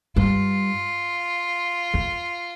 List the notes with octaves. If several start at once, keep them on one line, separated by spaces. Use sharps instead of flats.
G2 F4
F2